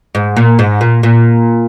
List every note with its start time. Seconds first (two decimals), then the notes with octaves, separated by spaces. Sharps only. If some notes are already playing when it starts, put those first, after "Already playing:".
0.15 G#2
0.37 A#2
0.59 G#2
0.81 A#2
1.03 A#2